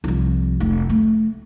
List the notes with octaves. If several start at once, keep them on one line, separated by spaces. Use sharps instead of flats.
C2 F3
F1
A3